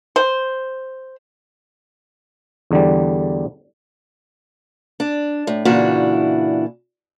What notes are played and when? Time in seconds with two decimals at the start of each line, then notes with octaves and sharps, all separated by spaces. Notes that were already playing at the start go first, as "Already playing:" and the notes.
0.16 C5
2.71 E2 D3 G3
5.00 D4
5.47 A2
5.65 A#2 C#3 E3 D4 E4 F#4